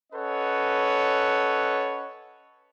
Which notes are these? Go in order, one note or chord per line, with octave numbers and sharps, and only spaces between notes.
C#4 A4 B4 C#5 D#5 F#5